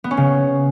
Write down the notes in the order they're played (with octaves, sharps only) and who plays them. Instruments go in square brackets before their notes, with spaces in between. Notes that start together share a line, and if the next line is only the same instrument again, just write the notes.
[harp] B3
C#4
C#3